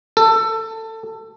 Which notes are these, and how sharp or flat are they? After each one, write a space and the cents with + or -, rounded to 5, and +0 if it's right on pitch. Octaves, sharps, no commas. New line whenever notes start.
A4 +20